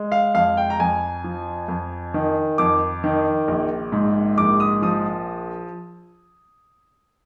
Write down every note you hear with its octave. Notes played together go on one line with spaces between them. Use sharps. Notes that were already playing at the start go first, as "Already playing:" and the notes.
Already playing: G#3
F5
F2 F5
G5
A#5
F2 G#5
F3
F2
D#3
F2 D6
D#3
A#1
G#2
A#1 D6
D#6
F3 D#6